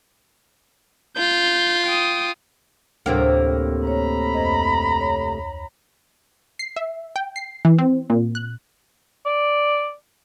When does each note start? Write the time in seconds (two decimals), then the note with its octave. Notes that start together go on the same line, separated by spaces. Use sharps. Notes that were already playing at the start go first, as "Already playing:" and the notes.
1.17 F4 G6
1.86 G5 D#6
3.06 D2 A2 C3 A#3 D4 G5
3.87 C#5 A#5 B5
4.34 F2 C5 D#5
5.01 C#5
6.59 C7
6.76 E5
7.16 G5
7.36 C7
7.65 E3
7.78 C4
8.10 A#2
8.35 F#6
9.26 D5